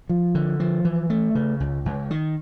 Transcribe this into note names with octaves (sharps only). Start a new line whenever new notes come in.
F3
D3
F3
E3
A3
C#3
C#2
C#2
D#3